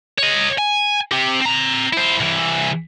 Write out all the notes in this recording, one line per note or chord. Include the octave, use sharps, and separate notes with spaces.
C#5 D#5
G#5
C4 G4
C4 A#5
E4 C5
C2 E3